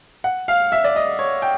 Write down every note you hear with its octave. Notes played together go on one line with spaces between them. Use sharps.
F#5
F5
E5
D5
D#5
C#5
G5